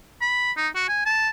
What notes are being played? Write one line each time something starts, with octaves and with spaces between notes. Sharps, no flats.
B5
D#4
F#4
G#5
A5